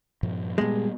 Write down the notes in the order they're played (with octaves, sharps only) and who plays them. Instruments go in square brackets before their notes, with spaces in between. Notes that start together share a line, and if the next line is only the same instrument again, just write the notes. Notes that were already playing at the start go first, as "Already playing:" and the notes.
[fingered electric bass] G2 A#2 F3
[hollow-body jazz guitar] G2 G#3 [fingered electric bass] A#2 B3